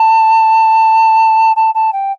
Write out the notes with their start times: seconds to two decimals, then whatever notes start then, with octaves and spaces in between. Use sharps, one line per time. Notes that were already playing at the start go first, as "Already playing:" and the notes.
Already playing: A5
1.56 A5
1.75 A5
1.93 G5